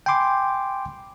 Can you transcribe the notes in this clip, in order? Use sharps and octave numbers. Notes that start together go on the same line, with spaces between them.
G5 G#5 B5 C6 D6